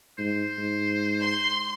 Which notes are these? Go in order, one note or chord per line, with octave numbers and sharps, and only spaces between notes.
G#2 C5
G#2
C6